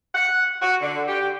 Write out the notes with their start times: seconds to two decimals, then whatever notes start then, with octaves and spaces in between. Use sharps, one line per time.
0.15 F#5
0.62 F#4
0.81 D3
1.07 G4